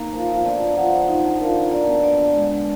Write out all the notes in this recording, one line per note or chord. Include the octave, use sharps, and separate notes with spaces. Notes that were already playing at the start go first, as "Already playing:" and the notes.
Already playing: A#3 D#4
F3 A#4
F3
B2 D3 D5
D#3
F3 F#5
F3
D#4
D3
F3 A#4
D#3
D3 D5
B2
D3 D5
D3
G#3
D3